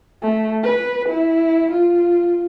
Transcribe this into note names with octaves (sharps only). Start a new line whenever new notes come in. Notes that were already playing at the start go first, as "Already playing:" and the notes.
A3
B4
E4
F4